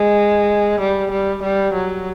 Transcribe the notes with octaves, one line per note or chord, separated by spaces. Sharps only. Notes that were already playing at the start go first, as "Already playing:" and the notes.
Already playing: G#3
G3
G3
G3
F#3